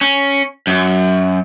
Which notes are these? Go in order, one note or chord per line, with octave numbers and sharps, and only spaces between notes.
C#4
F#2